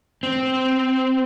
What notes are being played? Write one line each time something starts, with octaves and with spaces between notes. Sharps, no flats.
C4